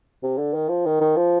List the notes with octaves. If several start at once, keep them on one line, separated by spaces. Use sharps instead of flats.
C3
D3
D#3
F3
D#3
D#3
F3